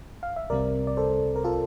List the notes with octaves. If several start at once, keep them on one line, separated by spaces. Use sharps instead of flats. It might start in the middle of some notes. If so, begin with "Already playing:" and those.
F5
E5
C2 C3 G3 C4 A#4 D5
D5
A4 C5
A#4
F4 A4